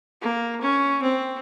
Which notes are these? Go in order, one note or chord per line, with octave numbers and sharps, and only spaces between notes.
A#3
C#4
C4